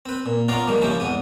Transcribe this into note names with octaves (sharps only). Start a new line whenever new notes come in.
C4 B4
A#2
B3 C#4 F4 D5 F5 A#5
G#2 D#3 F3 G3 A#3
C#3 F3 C#4 E4 G4
E2 G#2 B3 D#6